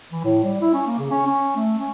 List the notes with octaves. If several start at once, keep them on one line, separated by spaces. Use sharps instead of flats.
E3
A2
G3
E4
C#4
A#3
C#3
C#4
C#4
A3
C#4